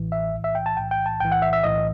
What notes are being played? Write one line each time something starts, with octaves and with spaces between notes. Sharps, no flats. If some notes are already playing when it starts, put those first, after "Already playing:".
Already playing: A1 A2 E3
E5
B1 A2 E3
E5
G5
A5
B1 A2 E3 G5
G5
A5
B1 A2 E3 G5
F#5
E5
E5
B1 A2 E3 D#5